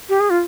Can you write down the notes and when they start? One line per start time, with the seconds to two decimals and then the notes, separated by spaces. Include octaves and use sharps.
0.09 G4
0.20 G#4
0.30 F4